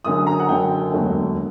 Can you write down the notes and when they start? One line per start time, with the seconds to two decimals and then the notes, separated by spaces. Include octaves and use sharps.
0.04 F#1 F#2 D3 F#3 D#6
0.27 A#5
0.39 F#5
0.49 F#1 F#2 D3 F#3 G5
0.93 E1 D#2 D3 F#3 A3